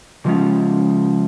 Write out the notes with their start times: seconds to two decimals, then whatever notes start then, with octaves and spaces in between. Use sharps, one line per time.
0.25 C#3 F3 G#3 C#4 F4